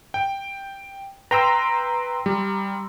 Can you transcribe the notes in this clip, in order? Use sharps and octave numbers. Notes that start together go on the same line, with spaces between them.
G5
B4 G5 A#5 C6 E6
G3